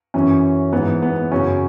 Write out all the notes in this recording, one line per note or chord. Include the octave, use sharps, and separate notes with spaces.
F#2 E3 C#4
G#2 E3 B3
B3
F#2 C#3 F#3 C#4